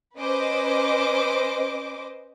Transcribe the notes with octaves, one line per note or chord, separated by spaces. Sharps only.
C#4 B4 C5 D#5 D6